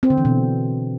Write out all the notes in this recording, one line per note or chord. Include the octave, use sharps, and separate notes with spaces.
C4
D3
E3
B2